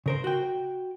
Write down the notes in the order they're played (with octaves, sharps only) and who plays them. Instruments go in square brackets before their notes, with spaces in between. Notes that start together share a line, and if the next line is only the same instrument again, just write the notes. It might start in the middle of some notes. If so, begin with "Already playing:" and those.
[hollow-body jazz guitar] C#3 A#4 C5
F#4 G5